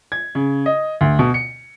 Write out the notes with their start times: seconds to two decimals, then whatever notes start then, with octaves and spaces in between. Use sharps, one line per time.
0.12 G#6
0.35 C#3
0.66 D#5
1.01 D2
1.19 B2
1.34 C#7